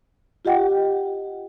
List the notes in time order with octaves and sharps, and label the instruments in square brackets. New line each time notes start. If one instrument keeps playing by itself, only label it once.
[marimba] F4 G4 D#5 F#5 G5